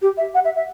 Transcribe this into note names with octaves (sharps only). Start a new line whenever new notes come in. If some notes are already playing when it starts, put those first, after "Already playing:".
G4
E5
F#5
E5
E5